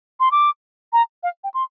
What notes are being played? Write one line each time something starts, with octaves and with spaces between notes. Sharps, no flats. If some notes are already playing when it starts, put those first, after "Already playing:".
C6
D6
A#5
F5
G5
C6